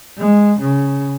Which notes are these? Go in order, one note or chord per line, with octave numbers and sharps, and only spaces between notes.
G#3
C#3